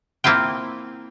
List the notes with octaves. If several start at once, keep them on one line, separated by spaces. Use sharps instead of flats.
A#3 C4 E4 F4 G5